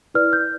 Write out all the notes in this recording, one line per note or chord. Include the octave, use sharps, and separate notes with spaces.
E4 B4 D5 F6
G6